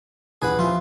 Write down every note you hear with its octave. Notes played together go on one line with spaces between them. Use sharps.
D#1 E3 G#4 B4 F#5 G#5
F3 F4 E5